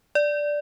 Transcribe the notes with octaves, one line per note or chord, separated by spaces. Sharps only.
D5